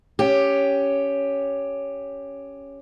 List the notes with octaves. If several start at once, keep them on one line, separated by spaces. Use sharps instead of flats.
C#4 G4